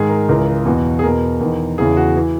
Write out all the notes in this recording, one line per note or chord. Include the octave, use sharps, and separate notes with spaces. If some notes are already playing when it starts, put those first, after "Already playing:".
Already playing: G#2 D#3 G#4
A#4
C#2 C#3 E3 A#4
E2 B2 F#4
G#4
E2 B2 A#4
E2 D#3
E2 C#3 E3 G#4
F#4
E3